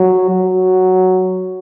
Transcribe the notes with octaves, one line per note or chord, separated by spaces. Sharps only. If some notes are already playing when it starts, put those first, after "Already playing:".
Already playing: F#3
F#3